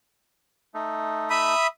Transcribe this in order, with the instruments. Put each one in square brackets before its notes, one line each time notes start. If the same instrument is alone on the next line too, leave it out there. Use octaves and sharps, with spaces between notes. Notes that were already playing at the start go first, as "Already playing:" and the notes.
[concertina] A3 D#4
[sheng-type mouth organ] E5 B5 D#6